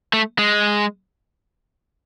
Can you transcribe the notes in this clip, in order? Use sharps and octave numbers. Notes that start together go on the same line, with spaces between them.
A3
G#3